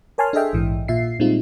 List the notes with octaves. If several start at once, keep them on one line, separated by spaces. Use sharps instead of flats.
A#4 C#5 G#5 A5 C6 F6
D4 G#4 A4 D#5 E5 G5
A#1 G#2 E3
A#2 F4 E5 C7
A#2 G3 G#3 C4 D#4 F4